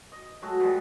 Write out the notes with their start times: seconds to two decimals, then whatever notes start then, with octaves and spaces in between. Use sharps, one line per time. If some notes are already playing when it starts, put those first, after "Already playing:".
0.12 D#5
0.42 F#3 G#3 A3 F#4
0.60 E3 F3 G3 G#3